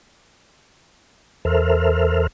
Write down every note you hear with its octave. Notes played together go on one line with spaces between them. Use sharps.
E2 A4 A#4 C5 E5 F6